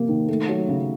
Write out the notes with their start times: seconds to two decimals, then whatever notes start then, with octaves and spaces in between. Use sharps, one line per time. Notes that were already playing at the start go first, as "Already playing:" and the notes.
Already playing: C3 F3 A#3
0.09 D#3
0.28 A3
0.49 F#3
0.68 C#3